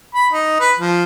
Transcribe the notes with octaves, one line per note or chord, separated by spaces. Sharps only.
B5
D#4
B4
F3